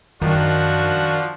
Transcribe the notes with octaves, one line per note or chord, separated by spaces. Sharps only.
F#2 D#3 F3 D4 F#4